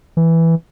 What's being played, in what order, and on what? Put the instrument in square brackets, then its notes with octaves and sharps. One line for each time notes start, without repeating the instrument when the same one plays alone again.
[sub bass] E3